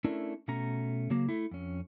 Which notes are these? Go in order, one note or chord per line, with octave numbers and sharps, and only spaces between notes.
A3 C#4 D4 E4 A#4
B2 A3 C#4 A#5
C#3 F#3 A#3
A3 E4
F2 C#4